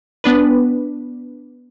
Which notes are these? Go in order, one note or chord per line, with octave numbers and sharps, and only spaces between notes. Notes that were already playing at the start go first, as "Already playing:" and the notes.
B3 D4 B4